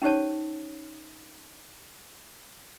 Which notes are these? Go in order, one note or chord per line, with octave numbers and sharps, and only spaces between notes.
C#4 D#4 G4 C5 C#5 A5